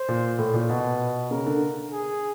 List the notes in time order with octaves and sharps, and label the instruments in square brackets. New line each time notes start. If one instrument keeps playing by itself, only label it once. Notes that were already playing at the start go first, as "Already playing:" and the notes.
Already playing: [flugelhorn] C5
[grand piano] A#2
A2
A#2
[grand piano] B2 [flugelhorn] B4
[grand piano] C#3 [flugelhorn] A#4
[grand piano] D3
[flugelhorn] G#4